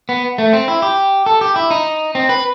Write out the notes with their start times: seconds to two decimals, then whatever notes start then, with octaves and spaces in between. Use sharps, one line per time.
0.09 B3
0.38 A3
0.53 C4
0.68 E4
0.82 G4
1.26 A4
1.41 G4
1.56 E4
1.71 D#4
2.15 C4
2.29 B4